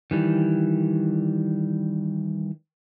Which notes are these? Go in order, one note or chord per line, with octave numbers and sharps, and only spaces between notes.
D#3 E3 G3